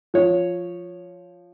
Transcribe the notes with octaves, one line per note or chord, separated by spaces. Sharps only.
F3 C#5